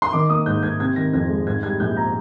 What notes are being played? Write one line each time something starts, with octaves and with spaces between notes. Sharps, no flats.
C6
D#3 D6
A#3 D#6
G#2 G6
G#2 G#6
C3 G#6
D#3 A#6
F2 G#6
G#3
G#2 G#6
G3 G#6
A#1 G6
A#5